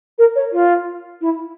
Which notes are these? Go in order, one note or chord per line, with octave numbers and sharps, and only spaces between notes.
A#4
C#5
F4
E4